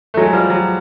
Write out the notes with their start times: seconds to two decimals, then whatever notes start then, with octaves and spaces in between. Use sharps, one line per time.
0.14 A3
0.17 F#3 G#3
0.33 F3 G3
0.50 F#3